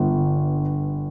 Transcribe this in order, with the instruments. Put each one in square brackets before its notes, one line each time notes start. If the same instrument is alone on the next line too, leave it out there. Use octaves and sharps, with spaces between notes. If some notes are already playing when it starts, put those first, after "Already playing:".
Already playing: [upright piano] G1 G2 D3